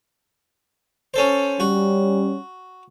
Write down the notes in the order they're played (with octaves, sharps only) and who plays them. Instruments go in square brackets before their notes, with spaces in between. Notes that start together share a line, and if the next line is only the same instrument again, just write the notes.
[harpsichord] C#4 A4 C5
[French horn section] G3 C#4 [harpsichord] F#4